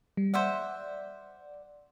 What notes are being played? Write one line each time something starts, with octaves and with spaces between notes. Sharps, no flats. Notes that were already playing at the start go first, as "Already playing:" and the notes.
G3
C5 D5 E5 F#5